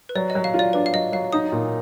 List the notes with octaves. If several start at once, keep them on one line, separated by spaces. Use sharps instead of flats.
B4
F#3 D5
D#5
F#3
F5
F4
D5
D4 B4
F5
F#3 D#5
F#3 F5
D#4 D#6
A#2